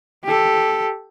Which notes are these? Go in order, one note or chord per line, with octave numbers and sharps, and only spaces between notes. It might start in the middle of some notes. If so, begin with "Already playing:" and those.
G4 A4